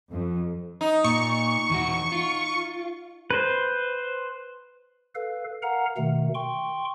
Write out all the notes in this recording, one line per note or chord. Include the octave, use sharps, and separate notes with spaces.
F2
D#4
A#2 C#6
E2 E3 F#4
F4
B4 C5
A4 B4 F5
A#4 F5 F#5 A#5
B2 D#3 A3
G5 C6 C#6